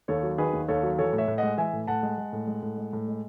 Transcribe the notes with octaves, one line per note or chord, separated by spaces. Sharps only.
D#2 A4 C#5
F#3
D#3 G#4 B4
D#2
D#2 A4 C#5
F#3
E3 A4 C#5
A2
C#5 E5
A2
G#3 D#5 F#5
E3 E5 G#5
A2
A2 F#5 A5
G#3
G#3
A2
G#3
A2
G#3
A2
G#3